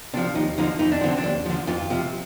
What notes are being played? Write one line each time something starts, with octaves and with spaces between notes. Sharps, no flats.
C3 F3 D4
D#2 D#4
D3 F3 D#4
F2 D#4
D4
D3 F3 C4
D4
D#2
D3 F3
F2 F4
C3 F3